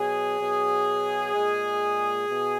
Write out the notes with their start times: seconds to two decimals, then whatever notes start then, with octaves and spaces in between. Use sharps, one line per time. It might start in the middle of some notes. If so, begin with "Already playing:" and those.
Already playing: B2 F#3 G#4
0.41 B2 F#3
1.34 A#2 G#3
2.28 B2